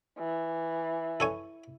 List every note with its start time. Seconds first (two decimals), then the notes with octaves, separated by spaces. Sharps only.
0.19 E3
1.20 A4 C#5 G#5